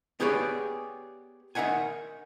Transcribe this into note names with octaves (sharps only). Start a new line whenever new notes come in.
B3 G4 G#4 B4 C#5 D5
D#4 A#4 E5 F#5 G#5